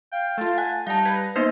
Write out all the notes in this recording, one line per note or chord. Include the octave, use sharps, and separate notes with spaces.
F5 G5
A3 F4 A5
F#5 G#5 F#6
G3 D#4 F5 A5
B4 A#5 G#6
A#3 B3 D#4 C5 D#5